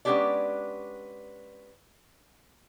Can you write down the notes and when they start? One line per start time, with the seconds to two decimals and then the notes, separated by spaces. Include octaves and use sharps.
0.05 G#3 B3 C#4 D4 G4 D5